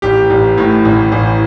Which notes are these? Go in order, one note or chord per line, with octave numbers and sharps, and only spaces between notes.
A1 G4
A1
A2
A1
A1